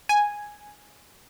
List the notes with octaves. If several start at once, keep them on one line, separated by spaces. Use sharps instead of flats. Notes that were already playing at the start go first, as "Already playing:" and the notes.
G#5